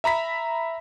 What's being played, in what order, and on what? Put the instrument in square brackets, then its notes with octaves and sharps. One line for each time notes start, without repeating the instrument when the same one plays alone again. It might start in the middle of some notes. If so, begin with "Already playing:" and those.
[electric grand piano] E5 A#5 B5 B6